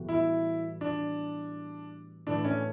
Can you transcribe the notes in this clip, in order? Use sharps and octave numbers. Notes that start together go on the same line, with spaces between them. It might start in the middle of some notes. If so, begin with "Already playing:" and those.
Already playing: A2 E3 G3 B3 F#4
E4
D4
A2 E3 A3 D4
C#4